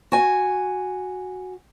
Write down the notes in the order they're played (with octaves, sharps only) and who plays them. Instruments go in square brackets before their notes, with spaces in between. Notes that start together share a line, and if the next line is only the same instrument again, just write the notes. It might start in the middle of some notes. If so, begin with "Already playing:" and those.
[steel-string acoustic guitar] F#4 G#5